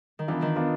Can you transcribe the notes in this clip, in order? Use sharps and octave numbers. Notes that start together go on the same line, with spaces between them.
D#3
E3 B3 D4 F4
D#3
B3 D4 F4